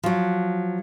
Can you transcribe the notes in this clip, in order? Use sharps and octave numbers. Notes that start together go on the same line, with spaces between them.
F3 F#3